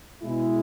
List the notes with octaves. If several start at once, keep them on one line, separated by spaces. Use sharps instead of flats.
B2 G#3 E4